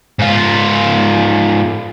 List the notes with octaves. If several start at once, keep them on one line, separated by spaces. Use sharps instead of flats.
G#2 F4